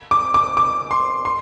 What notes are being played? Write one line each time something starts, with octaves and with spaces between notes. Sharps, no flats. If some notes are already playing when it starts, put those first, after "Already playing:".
D6
D6
D6
C6
C6